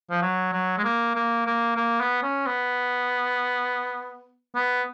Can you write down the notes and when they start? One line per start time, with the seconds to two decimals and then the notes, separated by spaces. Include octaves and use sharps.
0.11 F3
0.22 F#3
0.53 F#3
0.78 G#3
0.84 A#3
1.15 A#3
1.46 A#3
1.77 A#3
2.01 B3
2.23 C#4
2.47 B3
4.55 B3